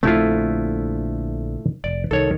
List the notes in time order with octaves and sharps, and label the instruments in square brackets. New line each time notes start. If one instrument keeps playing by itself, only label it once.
[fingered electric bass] A#1 D3 C4 [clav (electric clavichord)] A3 E4 F4
[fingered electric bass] F1 [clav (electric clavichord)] D5
[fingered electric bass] C2 D#3 [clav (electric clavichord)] A4 C#5